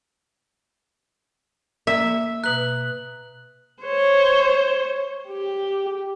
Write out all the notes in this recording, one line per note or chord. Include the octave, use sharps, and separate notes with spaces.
A#3 E5
B2 B4 A#5 F#6 F#7
C5 C#5
G4